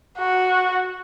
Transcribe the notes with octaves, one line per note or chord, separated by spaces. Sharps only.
F#4